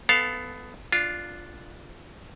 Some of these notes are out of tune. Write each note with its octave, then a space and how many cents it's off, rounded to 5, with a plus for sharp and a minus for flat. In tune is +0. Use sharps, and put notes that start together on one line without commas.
B3 +15 A4 +0 F5 +0
D4 +0 F4 +0